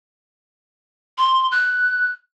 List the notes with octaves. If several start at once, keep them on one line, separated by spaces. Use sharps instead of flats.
C6
F#6